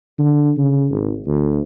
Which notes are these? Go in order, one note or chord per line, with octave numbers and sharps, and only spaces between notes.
D3
C#3
G#1
D2